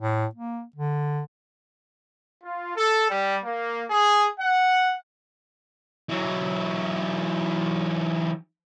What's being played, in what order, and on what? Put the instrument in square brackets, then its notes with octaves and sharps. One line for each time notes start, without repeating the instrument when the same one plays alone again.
[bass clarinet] A2
A#3
D3
[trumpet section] F4
A4
G3
A#3
G#4
F#5
[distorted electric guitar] E3 F#3